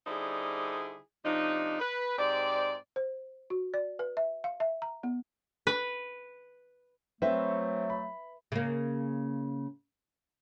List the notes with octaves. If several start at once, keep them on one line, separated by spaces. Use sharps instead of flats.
D3 G3 D#4 E4 G#4 C5
C3 F3 D4 D#4
B4
G#2 C4 G4 D5
C5
F#4
D5
B4
E5
F5
E5
A#5
B3
B4
F#3 A3 C4 B4 E5
B5
C#3 A#3